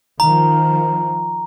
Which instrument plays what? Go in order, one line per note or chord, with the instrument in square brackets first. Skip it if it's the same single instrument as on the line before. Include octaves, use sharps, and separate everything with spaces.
[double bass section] D#3 F3 [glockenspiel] A#5